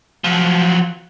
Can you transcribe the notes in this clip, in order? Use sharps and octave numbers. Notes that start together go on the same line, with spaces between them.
F3 F#3